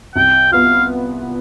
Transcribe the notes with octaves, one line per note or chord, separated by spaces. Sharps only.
C2 G5
B3 F4 F5